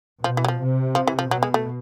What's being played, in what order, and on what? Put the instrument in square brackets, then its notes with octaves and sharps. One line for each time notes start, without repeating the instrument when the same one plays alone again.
[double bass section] B2 [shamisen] F3
[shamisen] E3
F#3
F3
[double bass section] C3
[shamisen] F3
E3
F3
[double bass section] B2 [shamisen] F#3
[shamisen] G#3
A3